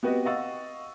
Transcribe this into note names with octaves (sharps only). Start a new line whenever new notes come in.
B3 C4 F#4 G4 B4 D#5
D#5 F5 F#5 C#6 E6 A6